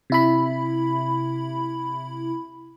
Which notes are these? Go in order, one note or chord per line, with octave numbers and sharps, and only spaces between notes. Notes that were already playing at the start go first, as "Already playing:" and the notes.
C3 E4 B5